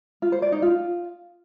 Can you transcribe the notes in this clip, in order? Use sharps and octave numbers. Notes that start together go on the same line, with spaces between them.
F4
C5
D5
D#4
F4